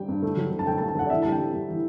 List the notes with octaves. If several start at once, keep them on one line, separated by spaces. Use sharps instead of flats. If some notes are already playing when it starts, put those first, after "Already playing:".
Already playing: G3 G5
G2
A3
F#3
A3
A5
A3 G5
A5
A3
A5
A3 F#5
D5
E3 E5
G3 A5
G5
G3
G3
E3